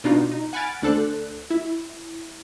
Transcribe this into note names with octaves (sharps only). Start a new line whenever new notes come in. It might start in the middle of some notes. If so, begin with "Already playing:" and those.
B2 D4 D#4 F4 F#4
D#4
F#5 G#5 B5 F6 A6 D7
D2 D4 A4 C5 F#6
E4